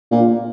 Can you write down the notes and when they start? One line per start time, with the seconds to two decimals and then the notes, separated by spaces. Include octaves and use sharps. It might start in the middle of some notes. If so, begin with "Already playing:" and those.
0.11 A#2